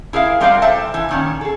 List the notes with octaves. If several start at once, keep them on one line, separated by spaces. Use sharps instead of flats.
E4 G#4 A#4 E5 F5
G3 C4 F#4 A#4 D5 F5
A4 C5 E5 G5 A5
E3
A#2 D#3 C#4
G#4 A4